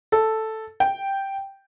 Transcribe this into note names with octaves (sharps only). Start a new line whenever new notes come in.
A4
G5